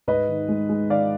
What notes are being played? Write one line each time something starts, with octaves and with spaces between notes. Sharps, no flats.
G#2 B4 D#5
D#3
G#3
G#3
D#3 D5 F5